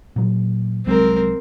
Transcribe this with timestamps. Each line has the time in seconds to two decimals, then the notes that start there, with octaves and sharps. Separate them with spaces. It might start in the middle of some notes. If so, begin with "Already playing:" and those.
0.16 A#2 F#3
0.86 C2 F#3 G#3 C4 A#4